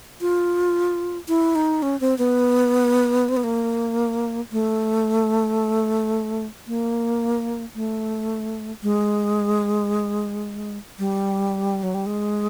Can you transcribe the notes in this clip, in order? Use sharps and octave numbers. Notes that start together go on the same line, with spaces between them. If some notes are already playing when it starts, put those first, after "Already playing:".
F4
E4
D#4
C#4
C4
B3
C4
B3
A#3
A3
A#3
A3
G#3
G3
F#3
G3
G#3